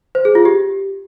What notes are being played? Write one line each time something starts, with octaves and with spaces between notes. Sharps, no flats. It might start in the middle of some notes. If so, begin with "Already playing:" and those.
C5
G#4
F4
G4